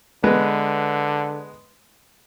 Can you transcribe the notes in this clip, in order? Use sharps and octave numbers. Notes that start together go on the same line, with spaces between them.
D3 G#3 B3 B4